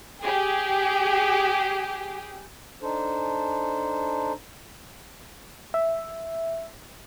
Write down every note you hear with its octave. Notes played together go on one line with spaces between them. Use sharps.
G4 G#4
D4 D#4 A4 C5
E5